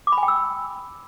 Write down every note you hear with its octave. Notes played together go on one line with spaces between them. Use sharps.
D6
B5
G#5
G5
E6